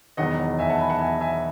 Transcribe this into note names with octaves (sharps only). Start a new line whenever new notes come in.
E1 E2 D#3 F#3 D#5 F#5
E5 G#5
F#5 A5
G#5 B5
F#5 A5
E5 G#5
E5 G#5